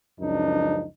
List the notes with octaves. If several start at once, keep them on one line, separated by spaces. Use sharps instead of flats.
C#2 F#2 F3 D4 D#4